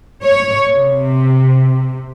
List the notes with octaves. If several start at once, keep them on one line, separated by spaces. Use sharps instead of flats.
C#5
C3